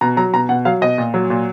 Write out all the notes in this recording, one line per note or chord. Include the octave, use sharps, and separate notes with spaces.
B2 A#5
F#3 A#5
B2 A#5
B2 F#5
F#3 F5
B2 D#5
A#2
F#3
A#2